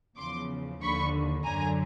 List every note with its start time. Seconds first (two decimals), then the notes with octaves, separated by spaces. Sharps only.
0.18 E2 C#3 F3 C6 D6
0.82 D#2 D3 F3 B5 C#6
1.44 F#2 D3 F#3 G#5 A#5